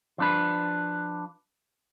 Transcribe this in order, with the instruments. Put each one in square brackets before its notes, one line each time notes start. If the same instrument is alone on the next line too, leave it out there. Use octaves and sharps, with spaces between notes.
[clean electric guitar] F3 D4 B4